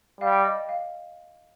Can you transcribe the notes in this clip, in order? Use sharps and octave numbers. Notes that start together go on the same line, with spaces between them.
G3 F5
G5
D#5
F5